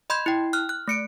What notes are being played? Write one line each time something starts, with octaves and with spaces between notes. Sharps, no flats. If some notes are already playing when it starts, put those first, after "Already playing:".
D#5 B5 C6 G6 G#6
E4 G5
F6 F#6
F#6
A3 C#7 D7